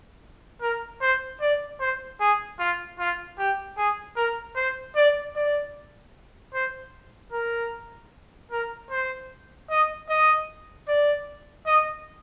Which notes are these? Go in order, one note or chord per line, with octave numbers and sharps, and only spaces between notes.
A#4
C5
D5
C5
G#4
F4
F4
G4
G#4
A#4
C5
D5
D5
C5
A#4
A#4
C5
D#5
D#5
D5
D#5